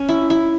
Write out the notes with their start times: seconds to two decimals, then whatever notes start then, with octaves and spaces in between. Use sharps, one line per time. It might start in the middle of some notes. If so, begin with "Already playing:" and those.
Already playing: C#4
0.09 E4
0.30 E4